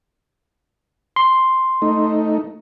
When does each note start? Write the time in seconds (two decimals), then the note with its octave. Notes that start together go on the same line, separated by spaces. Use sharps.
1.16 C6
1.82 A3 D#4